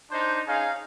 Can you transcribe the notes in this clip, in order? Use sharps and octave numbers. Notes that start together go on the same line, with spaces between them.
D4 D#4 C5
C#4 D#4 G#4 F5